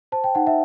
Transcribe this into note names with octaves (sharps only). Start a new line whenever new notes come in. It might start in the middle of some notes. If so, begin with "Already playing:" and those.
C5 A5
G5
D#4 F#5
E5